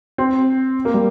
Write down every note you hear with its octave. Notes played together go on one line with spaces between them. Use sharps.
C4
A#3
G3